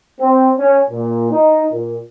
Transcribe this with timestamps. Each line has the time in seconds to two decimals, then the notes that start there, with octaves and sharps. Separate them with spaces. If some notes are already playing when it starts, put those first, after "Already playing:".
0.20 C4
0.58 C#4
0.90 A#2
1.31 D#4
1.72 A#2